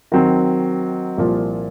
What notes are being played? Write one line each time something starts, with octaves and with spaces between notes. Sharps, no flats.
D#3 F#3 C4
C2 A#2 F3